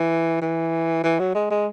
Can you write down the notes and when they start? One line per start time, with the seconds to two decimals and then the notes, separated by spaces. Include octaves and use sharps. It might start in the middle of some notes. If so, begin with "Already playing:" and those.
Already playing: E3
0.42 E3
1.04 E3
1.19 F#3
1.35 G#3
1.51 G#3